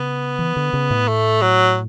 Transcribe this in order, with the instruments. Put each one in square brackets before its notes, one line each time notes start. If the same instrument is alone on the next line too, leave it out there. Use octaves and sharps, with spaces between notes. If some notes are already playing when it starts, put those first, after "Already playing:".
Already playing: [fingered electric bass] C#3 [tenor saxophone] B3
[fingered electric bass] E3
D3
C#3
A2
[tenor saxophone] A3
F#3